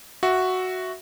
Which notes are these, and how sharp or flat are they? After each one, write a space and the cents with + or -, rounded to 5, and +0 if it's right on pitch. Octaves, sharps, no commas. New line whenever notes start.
F#4 +0 E5 +0